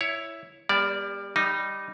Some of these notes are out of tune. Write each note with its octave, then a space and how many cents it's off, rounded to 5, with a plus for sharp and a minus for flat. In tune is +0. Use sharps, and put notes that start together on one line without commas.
E4 +0 C#5 +10
G3 +25 B3 -40 D5 -15
G3 +0 D#4 -10